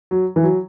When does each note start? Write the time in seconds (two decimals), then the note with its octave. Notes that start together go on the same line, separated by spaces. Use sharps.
0.11 F#3
0.36 E3
0.43 F#3